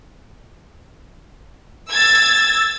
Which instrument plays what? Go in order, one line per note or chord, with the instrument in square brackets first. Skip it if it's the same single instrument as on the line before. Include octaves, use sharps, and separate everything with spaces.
[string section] E6 G#6 A6